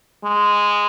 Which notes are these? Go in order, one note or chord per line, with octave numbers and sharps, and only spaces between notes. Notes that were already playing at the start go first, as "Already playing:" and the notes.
G#3